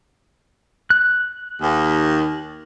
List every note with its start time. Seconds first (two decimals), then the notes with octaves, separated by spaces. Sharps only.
0.90 F#6
1.62 D#2